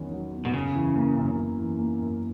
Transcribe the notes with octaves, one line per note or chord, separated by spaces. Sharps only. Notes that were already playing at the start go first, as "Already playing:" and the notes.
Already playing: E2 D#3 F#3 C#4
F#3
E2
B2
F#2 C#3
E3
A#3
F#2
F#2
E3
A#3
F#2